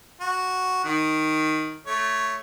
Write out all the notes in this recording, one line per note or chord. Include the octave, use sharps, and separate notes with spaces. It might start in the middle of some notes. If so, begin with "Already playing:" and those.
F#4
D#3
A3 C#5